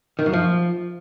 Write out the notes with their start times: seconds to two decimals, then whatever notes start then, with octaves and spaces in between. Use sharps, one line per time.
0.19 D#3
0.26 F#2
0.33 F3